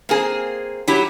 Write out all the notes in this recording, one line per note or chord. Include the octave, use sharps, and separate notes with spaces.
A#3 C4 G#4
F#3 E4 G4